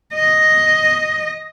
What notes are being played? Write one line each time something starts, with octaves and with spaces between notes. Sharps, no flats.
D#5